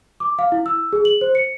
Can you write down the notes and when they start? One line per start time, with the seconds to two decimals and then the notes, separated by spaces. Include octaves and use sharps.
0.20 D6
0.39 F5
0.52 E4
0.66 E6
0.93 G#4
1.05 F#7
1.21 C5
1.35 C#7